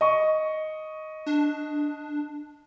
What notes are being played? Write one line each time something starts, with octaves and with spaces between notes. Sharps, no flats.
D#5 C#6
D4